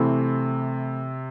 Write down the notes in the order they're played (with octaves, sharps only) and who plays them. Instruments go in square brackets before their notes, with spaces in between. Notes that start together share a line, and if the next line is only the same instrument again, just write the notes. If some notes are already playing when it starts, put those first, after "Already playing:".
Already playing: [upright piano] C3 [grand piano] E3 A3 C4 E4